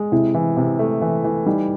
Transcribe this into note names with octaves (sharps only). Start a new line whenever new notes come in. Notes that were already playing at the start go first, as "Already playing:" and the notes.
Already playing: G#3
C3 E4
E3
C3
A3
E3
E3
G3 D#4